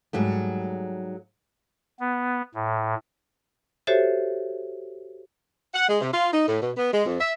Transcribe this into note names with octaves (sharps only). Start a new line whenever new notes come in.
G#2 F#3 G3 A3
B3
A2
F#4 G4 A4 C5 C#5 E5
F#5
G#3
C3
F4
D#4
A2
B2
B3
G#3
F2
E5